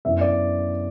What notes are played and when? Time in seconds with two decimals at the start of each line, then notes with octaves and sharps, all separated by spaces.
0.05 F#2 E3 B3 D4 E5
0.21 D5